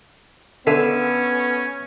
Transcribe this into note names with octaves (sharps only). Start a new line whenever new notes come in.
D3 B3 C#4 E5 F5 G#5